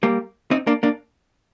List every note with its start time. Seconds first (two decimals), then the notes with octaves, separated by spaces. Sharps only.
0.03 G3 A#3
0.51 C4 D#4
0.67 A#3 D4
0.83 A#3 D4